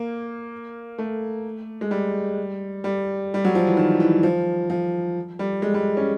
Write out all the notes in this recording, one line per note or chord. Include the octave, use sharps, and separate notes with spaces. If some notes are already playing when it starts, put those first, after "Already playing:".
Already playing: A#3
A3
G#3
G3
G3
G3
F#3
F3
E3
D#3
E3
F3
F3
G3
G#3
G3
C#4